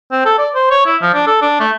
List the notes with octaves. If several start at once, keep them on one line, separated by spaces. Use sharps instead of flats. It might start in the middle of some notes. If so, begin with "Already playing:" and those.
C4
A4
D5
C5
C#5
E4
F3
D4
A4
D4
A3